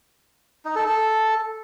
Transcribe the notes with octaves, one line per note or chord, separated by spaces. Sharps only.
D#4
A4
A4